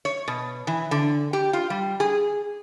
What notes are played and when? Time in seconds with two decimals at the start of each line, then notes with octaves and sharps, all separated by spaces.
0.05 C#5
0.28 B2
0.67 E3
0.91 D3
1.33 G4
1.53 F4
1.70 G3
2.00 G#4